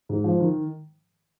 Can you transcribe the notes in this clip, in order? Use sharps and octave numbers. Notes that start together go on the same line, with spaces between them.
G#2
F3
D#3